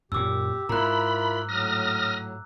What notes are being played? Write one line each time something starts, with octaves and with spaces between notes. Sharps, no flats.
F#2 A#2 G4 D6 E6
G#2 E4 F4 A#4 A#5 B5 F#6
A2 F#3 D#6 F6 A#6